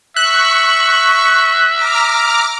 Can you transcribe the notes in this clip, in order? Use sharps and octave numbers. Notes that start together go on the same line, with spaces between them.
E5 C#6 F#6
A#5 D6 F6